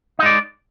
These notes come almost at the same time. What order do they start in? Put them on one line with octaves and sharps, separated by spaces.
D#4 G#3 D5